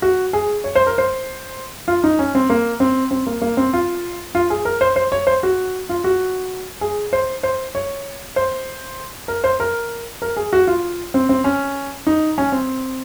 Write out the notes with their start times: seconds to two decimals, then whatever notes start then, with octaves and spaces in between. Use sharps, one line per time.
0.02 F#4
0.33 G#4
0.64 C#5
0.75 C5
0.87 A#4
0.98 C5
1.88 F4
2.04 D#4
2.19 C#4
2.35 C4
2.50 A#3
2.80 C4
3.11 C4
3.27 A#3
3.42 A#3
3.57 C4
3.73 F4
4.35 F4
4.50 G#4
4.65 A#4
4.81 C5
4.96 C5
5.12 C#5
5.27 C5
5.43 F#4
5.89 F4
6.04 F#4
6.81 G#4
7.13 C5
7.43 C5
7.75 C#5
8.36 C5
9.28 A#4
9.44 C5
9.60 A#4
10.22 A#4
10.37 G#4
10.53 F#4
10.67 F4
11.14 C4
11.29 C4
11.44 C#4
12.07 D#4
12.38 C#4
12.52 C4